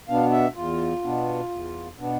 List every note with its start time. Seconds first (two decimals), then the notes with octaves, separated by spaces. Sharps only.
0.08 B2 B3 D4 F5
0.31 E5
0.55 E2 F4
1.03 B2 B3 D4
1.50 E2
1.98 B2 B3 D4